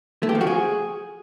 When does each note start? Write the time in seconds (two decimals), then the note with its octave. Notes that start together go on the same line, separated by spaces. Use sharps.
0.23 A3
0.29 G4
0.35 F3
0.41 F#4
0.47 G#4